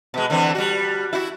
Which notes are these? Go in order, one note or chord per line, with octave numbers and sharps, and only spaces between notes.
B2 G#3
D3 E3 C4
G3 F#4
E4 F#4